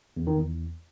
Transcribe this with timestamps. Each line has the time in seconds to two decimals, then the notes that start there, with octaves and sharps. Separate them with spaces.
0.17 E2
0.27 D#3
0.37 E2